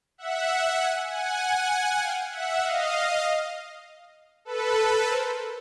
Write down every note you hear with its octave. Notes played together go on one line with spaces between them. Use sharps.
E5 F#5
F#5 G#5
F#5 G#5
F#5 G#5
F5 G5
E5 F#5
D#5 F5
A4 B4
A#4 C5